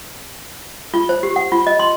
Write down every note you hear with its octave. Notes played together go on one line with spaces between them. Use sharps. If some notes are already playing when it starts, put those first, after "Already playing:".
F4
C5
G4
F#5
F4
D#5
C6